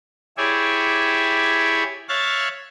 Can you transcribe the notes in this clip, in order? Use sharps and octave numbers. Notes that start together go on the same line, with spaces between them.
E4 G4 G#4 C#5 D5 E5
C#5 E5 F5 F#6 A6